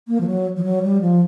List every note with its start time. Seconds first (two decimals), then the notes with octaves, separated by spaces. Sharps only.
0.08 A#3
0.21 F3
0.27 F#3
0.57 F3
0.64 F#3
0.83 G3
1.01 F3